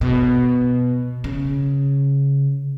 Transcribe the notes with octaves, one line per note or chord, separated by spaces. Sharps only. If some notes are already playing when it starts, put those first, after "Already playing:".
B2
C#3